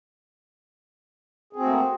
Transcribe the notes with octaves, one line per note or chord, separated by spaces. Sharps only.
A3 A#3 C4 F#4 G#4